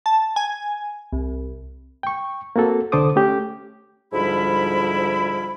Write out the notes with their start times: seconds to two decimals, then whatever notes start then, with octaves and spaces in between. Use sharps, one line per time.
0.06 A5
0.36 G#5
1.12 C2
2.03 G5 C#6
2.56 A#3 C4 F#4 A4
2.92 C2 D3 A4 C5 D6 D#6
3.16 A3 C#4 G4
4.13 D2 G#2 F3 G3 E4 B5